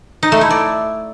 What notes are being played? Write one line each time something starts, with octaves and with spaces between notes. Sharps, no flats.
D#4
A3
E4
D5